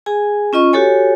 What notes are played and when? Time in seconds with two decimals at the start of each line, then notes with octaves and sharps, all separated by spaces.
0.06 G#4 G#5
0.53 C#4 F4 D#5 C#6
0.73 F#4 G4 A4 C#5 G#5